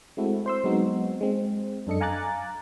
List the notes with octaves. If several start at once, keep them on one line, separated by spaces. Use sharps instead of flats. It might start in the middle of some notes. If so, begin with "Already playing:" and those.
G#3 A3 C4 E4 F#4 A4
C5 C6 E6
F#3 G#3 B3 C4 D#4 F#4
G#3 C4
F#2 D4 A4 D#5 C#7
F5 G#5 A#5 D6 F#6 A6